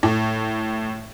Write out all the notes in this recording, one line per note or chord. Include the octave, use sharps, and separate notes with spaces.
A2